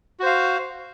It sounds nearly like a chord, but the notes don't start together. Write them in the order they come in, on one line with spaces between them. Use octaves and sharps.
F#4 C5 F5